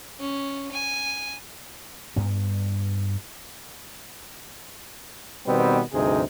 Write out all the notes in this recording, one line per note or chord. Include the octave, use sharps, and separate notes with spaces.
C#4
G#5
G2 B3
B2 D#3 G3 B3 C4
D2 G2 C3 D#4 G#4